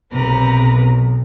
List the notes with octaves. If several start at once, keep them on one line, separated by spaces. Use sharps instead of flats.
B1 C3 A#4 B4